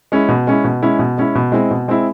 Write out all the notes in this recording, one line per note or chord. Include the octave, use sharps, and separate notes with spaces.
G#3 C#4 E4
B2
G#3 C#4 E4
B2
G#3 C#4 E4
B2
G#3 C#4 E4
B2
G#3 C4 E4
B2
G#3 C4 E4